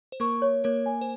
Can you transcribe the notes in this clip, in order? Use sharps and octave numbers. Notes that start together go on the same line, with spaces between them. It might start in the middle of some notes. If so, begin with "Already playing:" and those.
C5
A#3 A#4 C#6
C#5
A#3 A#4 C#5
G#5
C5